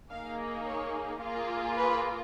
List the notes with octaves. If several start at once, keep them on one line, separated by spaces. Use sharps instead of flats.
A#3 D#4 G#4 F5
C#5
A#3 F4 G#4
B4